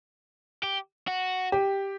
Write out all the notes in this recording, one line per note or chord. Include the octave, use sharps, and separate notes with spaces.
G4
F#4
G4